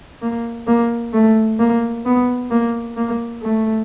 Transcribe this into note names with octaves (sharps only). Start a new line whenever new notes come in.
A#3
A#3
A3
A#3
B3
A#3
A#3
A3